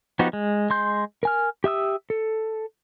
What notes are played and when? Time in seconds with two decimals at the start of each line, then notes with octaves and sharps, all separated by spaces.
0.19 F3 B3 D#4 F#4 G4
0.33 G#3
0.70 G#3 C6 G6
1.23 A#4 G#5 F6
1.64 G4 E5 D#6 E6
2.10 A4